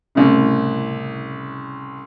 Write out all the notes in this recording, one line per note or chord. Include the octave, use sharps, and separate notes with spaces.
C2 A2 C#3